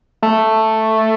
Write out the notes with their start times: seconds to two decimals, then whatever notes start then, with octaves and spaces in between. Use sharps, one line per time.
0.22 A3